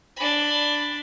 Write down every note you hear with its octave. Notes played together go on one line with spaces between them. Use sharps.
D4 B5